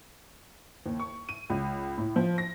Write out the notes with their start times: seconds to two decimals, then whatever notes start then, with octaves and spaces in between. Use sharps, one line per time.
0.86 D#2
1.00 C#6
1.29 D#7
1.50 C#2
1.98 A2
2.16 F3
2.38 A#6